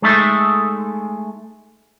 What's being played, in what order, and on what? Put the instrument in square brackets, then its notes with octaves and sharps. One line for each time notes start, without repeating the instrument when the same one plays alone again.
[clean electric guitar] G#3 A3 D#4 A4 E5